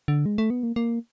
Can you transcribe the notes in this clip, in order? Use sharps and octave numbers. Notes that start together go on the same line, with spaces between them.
D3
G#3
A3
B3
A#3
A#3